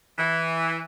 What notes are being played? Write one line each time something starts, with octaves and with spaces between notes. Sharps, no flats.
E3